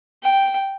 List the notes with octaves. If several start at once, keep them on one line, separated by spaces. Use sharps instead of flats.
G5